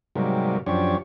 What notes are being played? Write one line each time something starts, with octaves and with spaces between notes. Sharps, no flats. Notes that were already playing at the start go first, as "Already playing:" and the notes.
G#2 C3 F#3 G3 A#3
F#2 F3 D4 G4 C#5